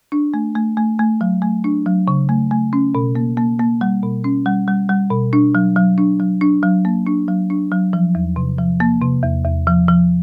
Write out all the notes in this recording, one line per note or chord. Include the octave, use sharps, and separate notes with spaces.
D4
A3
A3
A3
A3
F#3
A3
D4
F#3
C#3
A3
A3
C#4
B2
A#3
A#3
A#3
G3
B2
C#4
G3
G3
G3
B2
D4
F#3
F#3
D4
F#3
D4
F#3
A#3
D4
F#3
D4
F#3
F3
E2
C3
F3
A#3
C3
E2
E2
F3
F3